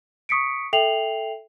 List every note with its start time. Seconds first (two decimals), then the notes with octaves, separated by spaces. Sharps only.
0.29 C#6 D#6 B6 C#7 D7
0.73 A4 E5 G5 C7 F7 F#7